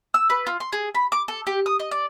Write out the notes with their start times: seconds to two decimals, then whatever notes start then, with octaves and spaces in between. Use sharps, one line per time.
0.14 E6
0.30 B4
0.47 F4
0.60 C6
0.73 G#4
0.95 B5
1.12 D6
1.28 A4
1.47 G4
1.66 D#6
1.79 D#5
1.91 D5